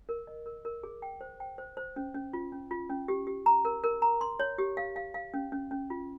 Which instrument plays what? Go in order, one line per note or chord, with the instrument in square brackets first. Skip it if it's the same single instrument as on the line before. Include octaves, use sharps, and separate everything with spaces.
[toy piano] A#4
D#5
A#4
A#4
G#4
G5
C5
G5
C5
C5
C#4
C#4
F4
C#4
F4
C#4
G4
G4
A#5
A#4
A#4
A#5
C6
C#5
G4
F5
F5
F5
C#4
C#4
C#4
F4